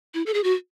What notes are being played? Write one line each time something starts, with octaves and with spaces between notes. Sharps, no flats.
E4
A4
G#4
F#4